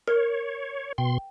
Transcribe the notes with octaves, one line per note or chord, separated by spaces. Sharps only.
A#4 C#5
B2 G5 C6